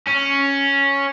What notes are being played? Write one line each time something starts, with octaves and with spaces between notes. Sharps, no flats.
C#4